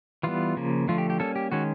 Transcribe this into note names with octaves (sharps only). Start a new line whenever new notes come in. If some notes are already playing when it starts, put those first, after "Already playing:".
E3 G3 B3 F4
C#3 F3 A#3
D3 F3 A3 F4
G4
G4
G3 A#3 C#4 A4
G4
D#3 G#3 C#4 F#4